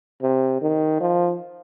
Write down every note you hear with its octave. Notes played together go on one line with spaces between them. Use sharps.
C3
D#3
F3